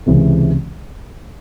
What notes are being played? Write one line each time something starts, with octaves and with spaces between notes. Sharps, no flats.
C#2 C3 E3 G#3